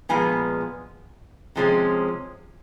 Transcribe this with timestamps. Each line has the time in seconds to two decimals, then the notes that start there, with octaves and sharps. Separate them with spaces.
0.09 A#2 F3 G#3 B3 G#5
1.55 C3 F3 G#3 C#4